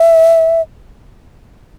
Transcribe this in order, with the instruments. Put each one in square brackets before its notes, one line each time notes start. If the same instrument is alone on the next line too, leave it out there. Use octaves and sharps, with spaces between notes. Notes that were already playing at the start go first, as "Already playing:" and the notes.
Already playing: [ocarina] E5